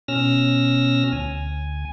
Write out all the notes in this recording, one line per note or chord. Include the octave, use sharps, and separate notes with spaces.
B2 C#4 E6 F6 A#6
D2 G#5